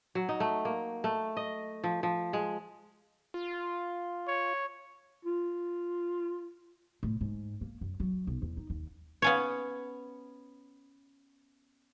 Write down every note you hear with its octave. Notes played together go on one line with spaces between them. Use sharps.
F#3
D#4
A3
A#3
A3
D#5
F3
F3
G#3
F4
C#5
F4
A2
G#2
A#3
F#2
F#3
B1
E2
D#4
D#2
B3 C#4 C#5